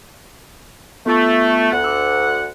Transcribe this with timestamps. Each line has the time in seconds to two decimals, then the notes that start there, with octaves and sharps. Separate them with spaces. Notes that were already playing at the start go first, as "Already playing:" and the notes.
1.06 A3 B3 F4 C#6
1.72 D2 F#5
1.84 D6 E6